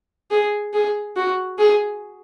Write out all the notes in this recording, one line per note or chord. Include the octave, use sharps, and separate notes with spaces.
G#4
G#4
F#4
G#4